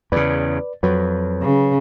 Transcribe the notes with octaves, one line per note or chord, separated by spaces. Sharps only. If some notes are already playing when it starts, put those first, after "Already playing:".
E2 C#3 B4 D5
F2 F#3 B4 C#5
C#3